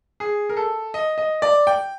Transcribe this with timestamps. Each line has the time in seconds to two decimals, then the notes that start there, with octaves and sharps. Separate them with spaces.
0.20 G#4
0.49 A#4
0.57 A4
0.94 D#5
1.18 D#5
1.42 D5
1.67 G5